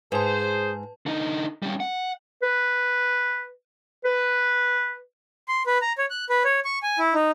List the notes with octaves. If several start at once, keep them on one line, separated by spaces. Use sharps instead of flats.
G#2 G#4 B4 C5 A5
D3 D#4
G3 C#4
F#5
B4
B4
C6
B4
A#5
C#5
F#6
B4
C#5
C#6
G#5
E4
D#4